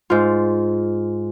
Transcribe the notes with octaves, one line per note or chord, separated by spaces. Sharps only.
G#2 F4